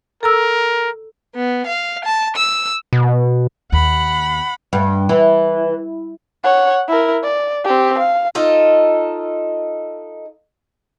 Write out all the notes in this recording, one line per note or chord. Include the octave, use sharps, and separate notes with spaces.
A4 A#4 A#5 E6
B3
F5
A5
E6
B2
D#2 F#5 B5
G2
E3
C#5 F#5
E4 A#4
D5
C4 G4
F5
D#4 F4 A4